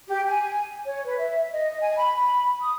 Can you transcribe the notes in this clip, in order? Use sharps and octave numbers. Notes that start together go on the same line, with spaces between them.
G4
G#5
C#5
B4
E5
D#5
G#5
B5
B5
D#6